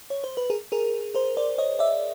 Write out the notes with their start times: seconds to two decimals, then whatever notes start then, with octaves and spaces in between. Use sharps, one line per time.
0.10 C#5
0.24 C5
0.37 B4
0.50 G#4 A#4
0.72 G#4 A#4
1.15 A#4 C5
1.37 C5 D5
1.58 C#5 D#5
1.79 D5 E5